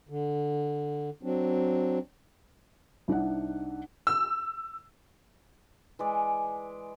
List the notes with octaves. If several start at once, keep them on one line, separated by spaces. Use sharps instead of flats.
D3
F#3 C4 D4
C2 D4 D#4 F#5
E6
E3 G#3 D5